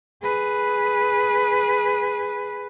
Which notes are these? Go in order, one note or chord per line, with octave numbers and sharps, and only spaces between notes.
G#4 B4